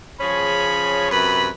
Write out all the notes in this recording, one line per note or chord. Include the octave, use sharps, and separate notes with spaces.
C#3 F3 C#4 G#4 C#5 B5
F#2 C3 B4 B5